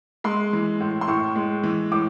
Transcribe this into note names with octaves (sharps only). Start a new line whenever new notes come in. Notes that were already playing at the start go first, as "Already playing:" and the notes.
G#3 C6
E3
A2
C6
A2 C#6
G#3
E3
A2 D6